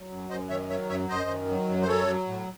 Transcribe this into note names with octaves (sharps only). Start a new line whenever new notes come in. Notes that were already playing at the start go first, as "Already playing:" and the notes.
Already playing: F#3
F#2
F#2 C5 D#5
D#3 C#5 E5
F#3 C#5 E5
F#2 C#5 E5
F#2 C5 D#5
D#3
F#3
F#2
C5
F#3 A4 C#5
F#3
A2